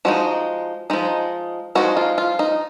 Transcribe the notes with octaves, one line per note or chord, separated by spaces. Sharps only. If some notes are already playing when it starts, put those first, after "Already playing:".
F3 G#3 D#4 F#4
F3 G#3 D#4
F3 G#3 D#4 F#4
F4
F4
D#4